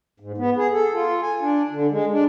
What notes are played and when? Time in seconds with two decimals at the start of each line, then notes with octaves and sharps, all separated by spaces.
0.20 G#2
0.38 B3
0.57 G#4
0.73 A4
0.94 F4
1.22 G#5
1.41 D4
1.70 D3
1.91 G#3
2.12 D4